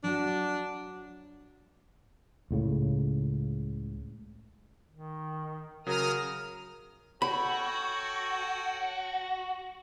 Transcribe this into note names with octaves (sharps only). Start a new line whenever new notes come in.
F#3 D4 F#4 F#5
C#2 A2 C#3
D#3
C#3 F#3 A#4 D#6 F6
F#4 A4 C#5 G5 B5